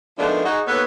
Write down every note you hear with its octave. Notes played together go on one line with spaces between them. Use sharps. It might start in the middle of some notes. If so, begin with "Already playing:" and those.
D#3 F3 G#3 A3 B3 D4
D#4 F#4 G#4
D#2 B3 A4 B4 C#5